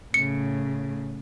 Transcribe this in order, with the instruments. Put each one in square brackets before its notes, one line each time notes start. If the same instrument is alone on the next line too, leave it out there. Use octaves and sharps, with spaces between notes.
[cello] A2 C#3 [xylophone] C#7